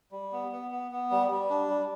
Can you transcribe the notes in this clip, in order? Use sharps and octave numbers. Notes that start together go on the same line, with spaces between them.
G3
B3
B3
B3
B3
G3
G3
D4
G3